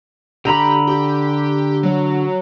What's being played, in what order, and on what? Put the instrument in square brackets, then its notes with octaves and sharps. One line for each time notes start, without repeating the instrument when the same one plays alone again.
[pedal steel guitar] D3 A#5 B5 [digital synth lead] G4
[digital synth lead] G4
F#3